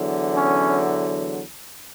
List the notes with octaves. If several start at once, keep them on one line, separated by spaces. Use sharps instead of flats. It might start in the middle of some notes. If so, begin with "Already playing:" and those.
Already playing: E2 D3 F#3
C#4